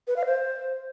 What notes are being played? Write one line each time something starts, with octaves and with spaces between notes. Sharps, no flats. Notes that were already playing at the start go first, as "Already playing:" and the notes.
B4
F5
C5